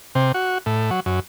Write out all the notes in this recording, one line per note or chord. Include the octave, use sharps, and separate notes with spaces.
C3
F#4
A2
F#3
F#2